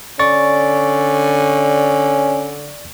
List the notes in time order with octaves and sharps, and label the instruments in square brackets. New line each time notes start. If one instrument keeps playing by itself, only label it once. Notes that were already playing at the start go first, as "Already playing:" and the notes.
[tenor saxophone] D3 [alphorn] C#4 [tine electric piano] D5 C#6 A6